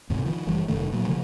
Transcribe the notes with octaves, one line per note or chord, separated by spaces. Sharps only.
D#2 G#2 C3
D#3 F3
F#1 E3 G3
F1 G2 D#3 A3
A#2 F#3
C#3 F3 A3